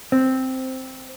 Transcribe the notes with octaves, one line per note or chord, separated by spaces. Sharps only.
C4